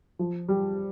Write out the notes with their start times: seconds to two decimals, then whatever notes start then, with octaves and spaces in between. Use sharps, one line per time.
0.19 F3
0.49 G3